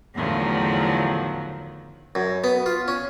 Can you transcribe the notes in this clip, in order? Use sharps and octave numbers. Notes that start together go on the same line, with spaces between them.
E2 A2 D3 D#3 F3 F#3
F#2
B3
F4
C#4